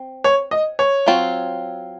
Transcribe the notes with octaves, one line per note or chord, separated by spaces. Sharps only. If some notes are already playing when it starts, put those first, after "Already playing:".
Already playing: C4
C#5
D#5
C#5
F#3 C4 F4